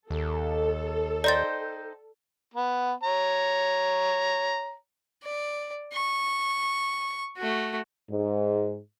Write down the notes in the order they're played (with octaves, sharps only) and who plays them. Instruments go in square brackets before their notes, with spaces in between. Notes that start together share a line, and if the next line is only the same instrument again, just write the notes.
[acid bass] D#2 [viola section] A4
[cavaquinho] D#4 C5 G5 [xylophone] D5 A6
[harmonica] B3
C#5 A#5
[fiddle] D5
C#6
A3 F#4
[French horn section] G#2